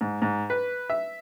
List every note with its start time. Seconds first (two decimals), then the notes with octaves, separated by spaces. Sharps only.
0.01 G#2
0.22 G#2
0.50 B4
0.90 E5